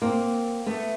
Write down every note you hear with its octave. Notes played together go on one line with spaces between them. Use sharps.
A#3 C4
A3 B3